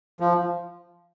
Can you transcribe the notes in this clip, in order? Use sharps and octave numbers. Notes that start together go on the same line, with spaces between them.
F3